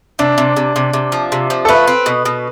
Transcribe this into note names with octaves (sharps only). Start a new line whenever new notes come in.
C3 D4
C3
C3
C3
C3
F3
C3
F3
A4
A3 B4
C4
B2
B2